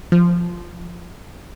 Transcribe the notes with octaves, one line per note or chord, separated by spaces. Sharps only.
F3